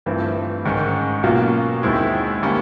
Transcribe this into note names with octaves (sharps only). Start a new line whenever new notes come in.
G2 E3 A3 C4 F4
G#2 D#3 G#3 C#4
B2 F#3 A#3 C#4 F4
D#2 D#3 G#3 C4 E4
D3 G3 A#3 C#4